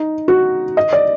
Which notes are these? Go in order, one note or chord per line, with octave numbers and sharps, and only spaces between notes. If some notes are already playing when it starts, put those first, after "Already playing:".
Already playing: D#4
F#4
D#5
D5